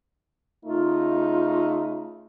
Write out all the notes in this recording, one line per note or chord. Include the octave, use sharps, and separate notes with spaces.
C#3 A3 D#4 F4